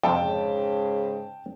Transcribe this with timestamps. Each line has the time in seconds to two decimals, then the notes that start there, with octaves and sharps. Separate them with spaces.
0.03 F2 C3 G5 A5
0.21 G#2 C#3